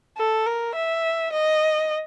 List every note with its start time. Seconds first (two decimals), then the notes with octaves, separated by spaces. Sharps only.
0.17 A4
0.46 A#4
0.76 E5
1.33 D#5